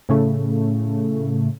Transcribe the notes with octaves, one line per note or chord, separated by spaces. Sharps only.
A2 C#3 A3